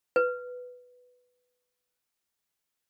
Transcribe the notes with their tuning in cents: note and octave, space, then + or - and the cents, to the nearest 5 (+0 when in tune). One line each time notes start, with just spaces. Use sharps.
B4 +5